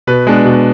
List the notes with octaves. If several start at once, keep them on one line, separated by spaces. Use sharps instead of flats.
B2 B4
G#3 B3 D4
B2